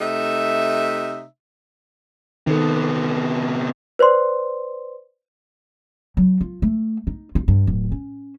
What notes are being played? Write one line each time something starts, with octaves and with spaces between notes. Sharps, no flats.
C3 A3 D#4 E5
C3 D#3 B3 A4
B4 C5 D5 C6
F#3
F4
A3
D#4
F4
G2
D1
C#4